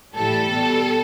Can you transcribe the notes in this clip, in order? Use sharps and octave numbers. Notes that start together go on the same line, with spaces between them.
A2 E3 G3 A4
B2 G3